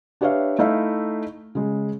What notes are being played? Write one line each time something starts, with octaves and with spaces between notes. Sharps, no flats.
D4 G4 B4 C#5 E5 F5
A3 D#4 E4 F5
C#3 G#3